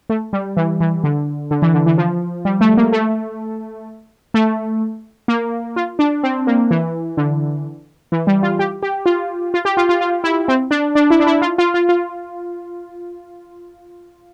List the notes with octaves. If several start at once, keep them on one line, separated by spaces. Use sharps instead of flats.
A3
G3
E3
E3
D3
D3
E3
D3
E3
F3
G3
A3
A#3
A3
A3
A#3
F4
D4
C4
A#3
E3
D3
E3
G3
F4
G4
G4
F4
F4
G4
F4
F4
F4
E4
C4
D4
D4
E4
D4
E4
F4
F4
F4
F4